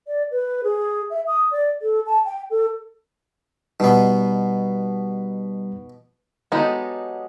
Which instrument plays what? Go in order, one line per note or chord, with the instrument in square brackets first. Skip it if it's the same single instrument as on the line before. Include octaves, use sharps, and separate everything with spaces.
[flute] D5
B4
G#4
E5
D#6
D5
A4
A5
G5
A4
[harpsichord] B2 B3 [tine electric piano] G3 D#4
[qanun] F#3 B3 A4 [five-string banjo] G#3 D#4 G4